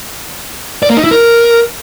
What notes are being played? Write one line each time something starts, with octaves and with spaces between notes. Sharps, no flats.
D5
A#3
D#4
E4
A#4